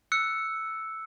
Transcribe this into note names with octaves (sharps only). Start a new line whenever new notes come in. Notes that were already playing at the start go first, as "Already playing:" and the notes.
E6 F#6 C#7